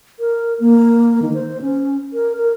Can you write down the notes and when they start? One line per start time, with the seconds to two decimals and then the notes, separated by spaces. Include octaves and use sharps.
0.19 A#4
0.60 A#3
1.22 D#3
1.34 C5
1.62 C#4
2.13 A#4
2.37 A#4